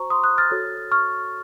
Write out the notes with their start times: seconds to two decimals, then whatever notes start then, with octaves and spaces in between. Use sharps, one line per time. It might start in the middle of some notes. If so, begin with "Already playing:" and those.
Already playing: F#4 C5 A#5 C#6
0.10 C6 D#6
0.24 D#6 F#6
0.38 F6 A6
0.51 F#4 A4 C#5
0.92 C#6 F6